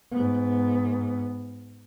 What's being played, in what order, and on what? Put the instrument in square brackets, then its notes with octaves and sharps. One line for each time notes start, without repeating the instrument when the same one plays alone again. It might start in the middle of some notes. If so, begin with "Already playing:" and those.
[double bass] G#2 B3